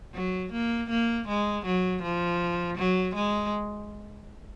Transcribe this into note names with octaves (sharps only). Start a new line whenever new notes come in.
F#3
A#3
A#3
G#3
F#3
F3
F#3
G#3